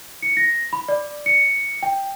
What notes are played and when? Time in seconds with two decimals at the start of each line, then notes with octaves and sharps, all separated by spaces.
0.22 C#7
0.37 A#6
0.73 B5
0.88 D5
1.26 C#7
1.83 G5